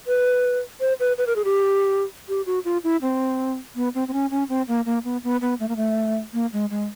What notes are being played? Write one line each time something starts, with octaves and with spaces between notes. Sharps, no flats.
B4
C5
B4
B4
A#4
G#4
G4
G4
F#4
F4
E4
C4
B3
C4
C4
C#4
C#4
C4
A#3
A#3
B3
B3
B3
A3
A#3
A3
A#3
G#3
G#3